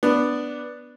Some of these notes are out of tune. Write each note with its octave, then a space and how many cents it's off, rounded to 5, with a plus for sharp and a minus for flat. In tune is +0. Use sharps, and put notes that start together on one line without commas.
B3 +0 D4 +0